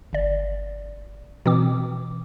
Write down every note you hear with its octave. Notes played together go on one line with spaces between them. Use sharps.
G1 D5
B2 E3 C4 D6